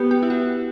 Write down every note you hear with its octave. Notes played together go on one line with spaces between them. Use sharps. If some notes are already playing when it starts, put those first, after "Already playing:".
Already playing: B3 G4
G4
E4
F#4